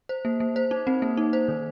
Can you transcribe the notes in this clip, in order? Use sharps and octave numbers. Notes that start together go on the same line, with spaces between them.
C5
A#3
A#3
C5
D#4
C4
A#3
D#4
C5
D#3